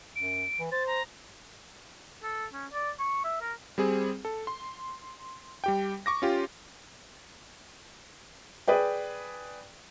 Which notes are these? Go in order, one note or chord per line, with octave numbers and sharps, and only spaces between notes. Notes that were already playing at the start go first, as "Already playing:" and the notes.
F#2 D7
E3
C5 A6
A#5
A4
C#4
D5
C#6
E5
A#4
G3 C4 G#4
A4
C6
G3 G4 G5
C#6 D6 A#6
C#4 F4 G4
G#4 B4 D5 G5